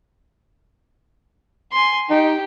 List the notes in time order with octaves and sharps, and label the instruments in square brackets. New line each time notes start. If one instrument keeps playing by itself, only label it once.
[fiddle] G#5 C6
[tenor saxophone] D#4 [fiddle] G4